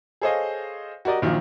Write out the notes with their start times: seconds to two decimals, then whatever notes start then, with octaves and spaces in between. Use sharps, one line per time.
0.21 G#4 A4 C5 C#5 D#5 F5
1.05 F#4 G4 A#4 D5 D#5
1.22 A#1 A#2 D#3 F3 F#3